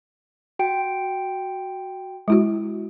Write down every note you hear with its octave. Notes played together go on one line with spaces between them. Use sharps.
F#4 G5 D7
G#3 E4 F#4